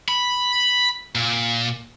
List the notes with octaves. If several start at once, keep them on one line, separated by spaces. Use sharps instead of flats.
B5
A#2